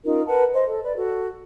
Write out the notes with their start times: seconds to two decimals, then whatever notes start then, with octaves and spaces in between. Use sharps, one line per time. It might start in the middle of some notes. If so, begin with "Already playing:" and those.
0.04 C#4 D#4 F4 A#4
0.28 A#4 B4 F#5 A5
0.53 C5 D#5
0.66 A4
0.83 B4 D5
0.96 F#4 A4